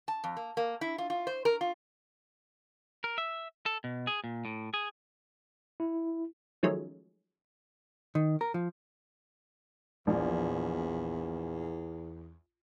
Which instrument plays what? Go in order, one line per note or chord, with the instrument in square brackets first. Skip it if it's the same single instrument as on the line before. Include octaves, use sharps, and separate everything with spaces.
[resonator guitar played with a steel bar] A5
F2
A#3
A#3
E4
F4
F4
C5
A#4
F4
[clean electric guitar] A#4
E5
A4
B2
G#4
A#2
A2
G#4
[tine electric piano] E4
[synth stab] D#3 F3 F#3 G#3 A3 C#4
[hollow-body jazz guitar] D#3
A#4
F3
[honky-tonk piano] A#1 [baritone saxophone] E2